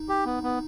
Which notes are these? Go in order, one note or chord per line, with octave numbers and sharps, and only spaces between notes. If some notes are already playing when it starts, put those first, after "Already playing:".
Already playing: D#4
G4
B3
B3